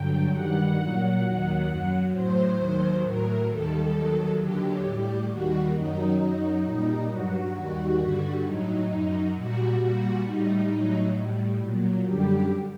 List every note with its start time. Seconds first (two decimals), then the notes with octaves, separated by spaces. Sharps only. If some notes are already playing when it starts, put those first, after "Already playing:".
Already playing: G2 D3 F#3 G5
0.31 G2 D#3 G3 F#5
0.77 A#2 F#3
1.22 D#2 D#3 F#3
1.67 F#2 F#3
2.12 A2 F#3 C5
2.57 D#2 D#3 F#3
3.02 A2 F#3 A#4
3.47 D#2 D#3 G3 A4
3.93 D#2 D#3 F#3
4.38 D#2 D3 F#3 G4
4.83 A2 G3
5.28 D#2 D#3 G3 F#4
5.74 F#2 D#3 F#3 D#4
6.19 F#2 F#3 D#4
6.64 A#2 G3 D#4
7.09 G2 F#3 F#4
7.54 D#2 D#3 G3 F#4
8.00 G2 D3 G3
8.44 A2 F#3 D#4
8.89 F#2 F#3
9.34 A#2 G3 F#4
9.79 A#2 G3 F#4
10.25 A2 G3 D#4
10.70 A2 F#3
11.15 A2 G3
11.61 A#2 F#3
12.05 F#2 D3 G3 G4